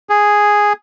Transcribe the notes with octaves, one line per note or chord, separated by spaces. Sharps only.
G#4